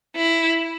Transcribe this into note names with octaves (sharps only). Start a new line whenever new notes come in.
E4